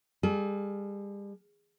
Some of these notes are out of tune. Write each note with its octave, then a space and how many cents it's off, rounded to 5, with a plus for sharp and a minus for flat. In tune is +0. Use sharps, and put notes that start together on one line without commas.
G3 +40 A4 -45